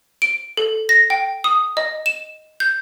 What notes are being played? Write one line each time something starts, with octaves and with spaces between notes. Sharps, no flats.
D7
A4
A#6
G5
D#6
D#5
E7
G6